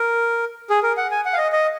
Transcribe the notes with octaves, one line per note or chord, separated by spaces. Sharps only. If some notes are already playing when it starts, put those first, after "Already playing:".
Already playing: A#4
G#4
A#4
F#5
G#5
F#5
F5
D#5
D#5